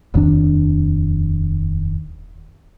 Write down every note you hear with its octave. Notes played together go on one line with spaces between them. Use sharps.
D#1 F2 D#3 D4